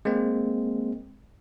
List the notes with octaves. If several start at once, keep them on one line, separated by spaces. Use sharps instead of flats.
G#3 A#3 C4